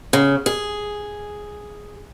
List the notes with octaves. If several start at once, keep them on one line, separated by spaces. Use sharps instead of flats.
C#3
G#4